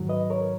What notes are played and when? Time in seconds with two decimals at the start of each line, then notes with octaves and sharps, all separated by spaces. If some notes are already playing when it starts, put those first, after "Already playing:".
Already playing: G#2 D#3 F#3
0.09 B4 D#5
0.30 A#4 C#5